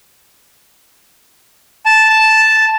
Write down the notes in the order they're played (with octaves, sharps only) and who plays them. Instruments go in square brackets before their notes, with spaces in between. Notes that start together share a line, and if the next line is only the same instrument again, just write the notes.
[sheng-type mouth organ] A5